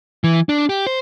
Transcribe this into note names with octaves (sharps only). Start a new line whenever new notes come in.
E3
D4
G4
C5